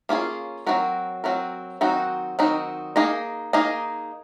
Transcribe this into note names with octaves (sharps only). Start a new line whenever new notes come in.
A#3 C#4 F4 G#4
F#3 C4 F#4 A#4
F#3 C4 F#4 A#4
D#3 F#3 C4 D#4 F#4
D#3 F#3 C4 D#4 F#4
A#3 D#4 G#4 D#5
A#3 D#4 G#4 D#5